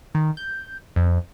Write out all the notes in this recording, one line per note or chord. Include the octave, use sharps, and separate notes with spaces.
D#3
G6
F2